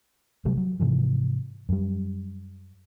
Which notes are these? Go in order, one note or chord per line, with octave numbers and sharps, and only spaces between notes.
C3 F#3 G3 A3
F#3
G#2 C3 E3 F3
F#2 G3